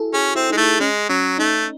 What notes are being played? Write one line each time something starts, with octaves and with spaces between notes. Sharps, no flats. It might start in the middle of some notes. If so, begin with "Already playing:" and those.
Already playing: E4 F#4 G#4 A4
C#4 G#4
C4 E4
G#3 D#4
A3 E4
G#3 C#4
F#3 C#4
A3 D#4